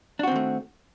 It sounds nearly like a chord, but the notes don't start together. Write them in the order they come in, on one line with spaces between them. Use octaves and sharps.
D4 F#4 C4 D#3 A3